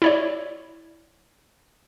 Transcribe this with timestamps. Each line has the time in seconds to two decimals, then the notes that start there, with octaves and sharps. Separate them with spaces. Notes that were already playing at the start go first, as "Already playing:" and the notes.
0.02 E4 C#5 D5